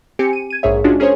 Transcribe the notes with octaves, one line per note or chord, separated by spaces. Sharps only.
C4 G4 G#5 C#7
D#7
G#6 D#7
A#1 G#2 G#4 C#5 E5
G#3 C#4 D4 F4 F#4
C#4 G#4 A#4 C5 C#5